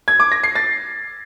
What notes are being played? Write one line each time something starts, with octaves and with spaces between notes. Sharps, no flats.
G#6
D6
A#6
C7
A6